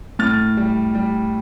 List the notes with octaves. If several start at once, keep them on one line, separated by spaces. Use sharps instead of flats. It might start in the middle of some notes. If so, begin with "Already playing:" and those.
A2 F6 A6
G3
G3